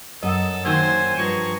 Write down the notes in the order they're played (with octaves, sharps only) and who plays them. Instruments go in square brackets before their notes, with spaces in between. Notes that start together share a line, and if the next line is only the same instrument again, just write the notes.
[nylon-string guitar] F#2 F#5 [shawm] A4 [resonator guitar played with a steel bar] D#5
[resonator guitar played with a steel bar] D#3 F#3 A#3 [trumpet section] C5 [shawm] G#5
[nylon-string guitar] G2 F3 [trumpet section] G#4 A#5 C#6